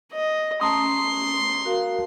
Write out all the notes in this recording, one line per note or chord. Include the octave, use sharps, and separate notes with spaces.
D#5
A3 C#4 A5 A#5 C6 D#6
F#4 A#4 F5